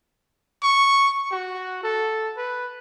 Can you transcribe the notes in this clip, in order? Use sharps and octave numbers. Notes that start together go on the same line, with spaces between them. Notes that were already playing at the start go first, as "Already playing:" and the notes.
C#6
F#4
A4
B4